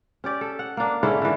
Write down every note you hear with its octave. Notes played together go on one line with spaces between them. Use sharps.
C#4 G4 D5
A4
F#5
A#3 D4
G#2 D3 C#4 E4
D3 E3